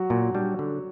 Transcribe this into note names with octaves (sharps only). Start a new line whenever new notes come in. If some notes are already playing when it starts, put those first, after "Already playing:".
Already playing: F#3 F#4
A#2
G3 D4
D3